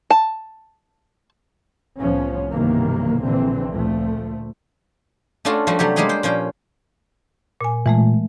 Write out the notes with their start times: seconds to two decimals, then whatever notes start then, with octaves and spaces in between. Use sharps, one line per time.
0.11 A5
2.00 C2 A2 F3 B3 C#4
2.51 B1 G2 C3 D#3 E3 A#3
3.23 A#1 D3 E3 C4
3.71 D2 A#2 F3 A3
5.45 A3 C#4 D4 F4 F#4 A4
5.67 F3 G3 A3 F#4
5.79 C3 F#3 A3 G4
5.96 G3 G#3 A#3 G4 G#4 G5
6.09 C5 G5
6.23 A#2 F3 C#4 G5
7.61 A#2 G#5
7.86 A#2 E3 G#3 A3